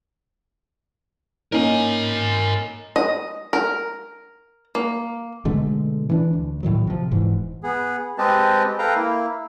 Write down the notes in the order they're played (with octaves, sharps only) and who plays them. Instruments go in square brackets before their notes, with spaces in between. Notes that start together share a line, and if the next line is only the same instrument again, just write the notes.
[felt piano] A#3 C#4 D#4 [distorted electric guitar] A#4 G#5
[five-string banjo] D#5
A#4
A#3
[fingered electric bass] B2 D3 G#3 A3
E3 C#4 D4
D2
A#1 A2 D#3 F#3
C3 F3
E1 G#2 E3
[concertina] B3 G#4
G#3 C4 G4 B4 D#5 A5
A4 B4 F5 G5 A#5
A#3 E4